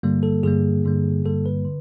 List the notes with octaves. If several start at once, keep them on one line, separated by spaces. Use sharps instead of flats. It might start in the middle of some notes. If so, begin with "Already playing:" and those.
G2 D3 G3 A#3
A4
G2 D3 G3 A#3 G#4
G2 D3 G3 A#3
G2 D3 G3 A#3 A4
B4
D3